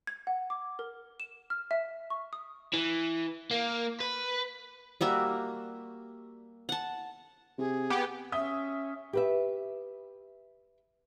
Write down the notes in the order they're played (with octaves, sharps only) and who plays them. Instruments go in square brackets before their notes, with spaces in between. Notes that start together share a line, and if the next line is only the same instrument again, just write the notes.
[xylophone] G#6
F#5
D6
A#4
E7
F6
E5
C#6
D#6
[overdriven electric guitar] E3
A#3
B4
[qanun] G3 A#3 F#4 E5
F#5 A5
[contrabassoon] C3 [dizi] G#4
[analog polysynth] B3 G4
[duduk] C#4 [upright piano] E5 D#6 G7
[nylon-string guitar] G4 B4 E5